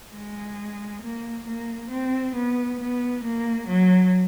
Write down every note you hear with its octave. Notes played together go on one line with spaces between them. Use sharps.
G#3
A#3
A#3
C4
B3
B3
A#3
F#3